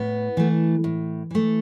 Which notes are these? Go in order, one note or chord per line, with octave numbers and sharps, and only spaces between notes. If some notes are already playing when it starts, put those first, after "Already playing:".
Already playing: A2 B3
E3 A3
A2
E3 A3